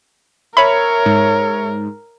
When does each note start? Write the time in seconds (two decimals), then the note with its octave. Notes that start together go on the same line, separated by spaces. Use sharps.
0.57 A#4 C#5 E5 B5
1.06 G#2